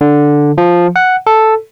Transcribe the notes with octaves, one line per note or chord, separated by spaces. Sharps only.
D3
F3
F#5
A4